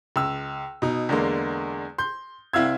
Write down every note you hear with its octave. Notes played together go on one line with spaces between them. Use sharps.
C#2 E6
B2 D#4
E2 D3 G#3 A#3
C6 G6
C2 C4 E4 F5 E6 G#6